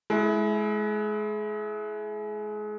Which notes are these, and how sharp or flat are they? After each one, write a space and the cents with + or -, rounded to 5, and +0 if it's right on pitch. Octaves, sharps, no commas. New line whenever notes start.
G#3 +30 E4 +0